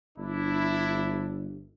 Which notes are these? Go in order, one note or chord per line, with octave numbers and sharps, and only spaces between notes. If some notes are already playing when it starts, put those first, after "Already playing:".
G1 D4 E4